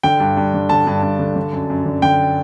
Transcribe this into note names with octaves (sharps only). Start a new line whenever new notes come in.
D3 G5
G2
G2
D3
D3 A5
G2
G2
D3
D3
F#2
F#2
D3
D3 G5